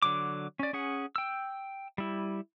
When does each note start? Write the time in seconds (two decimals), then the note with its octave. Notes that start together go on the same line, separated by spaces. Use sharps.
0.02 D3 F#3 D6
0.59 C#4 D5
0.73 C#4 G#4 F#5
1.16 G5 E6
1.98 G3 E4